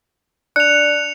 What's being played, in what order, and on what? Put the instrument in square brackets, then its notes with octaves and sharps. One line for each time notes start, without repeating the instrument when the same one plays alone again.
[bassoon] D4 [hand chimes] F#6 [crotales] C#7 F7